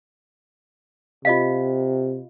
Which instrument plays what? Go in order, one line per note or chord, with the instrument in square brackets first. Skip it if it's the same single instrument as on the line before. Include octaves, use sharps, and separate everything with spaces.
[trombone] C3 [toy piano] F4 D#5 F5